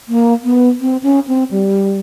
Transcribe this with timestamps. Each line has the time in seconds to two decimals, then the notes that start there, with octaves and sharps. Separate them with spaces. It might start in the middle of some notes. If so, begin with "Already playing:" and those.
0.09 A#3
0.44 B3
0.81 C4
1.03 C#4
1.27 C4
1.51 G3